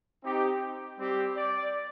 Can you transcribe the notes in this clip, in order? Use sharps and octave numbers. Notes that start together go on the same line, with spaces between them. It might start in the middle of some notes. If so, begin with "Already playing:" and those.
C4 D#4 G4
G3 C4 G4
D5